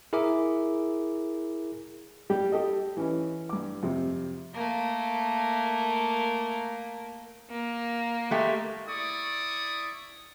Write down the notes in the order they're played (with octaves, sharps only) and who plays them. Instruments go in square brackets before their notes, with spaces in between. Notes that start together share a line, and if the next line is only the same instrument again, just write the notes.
[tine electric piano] E4 G#4 A#4 E5 D6
[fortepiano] G3 G4
G4 A4 D#5
E3 C#4
G2 D6
F2 C3
[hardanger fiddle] A3 A#3
[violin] A#3
[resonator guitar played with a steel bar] G#3 A3 G4
[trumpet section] E4 D5 C#6 D#6